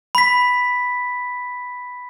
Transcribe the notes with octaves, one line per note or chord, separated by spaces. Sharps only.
B5 B6